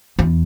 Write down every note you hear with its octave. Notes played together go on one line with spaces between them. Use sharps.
E2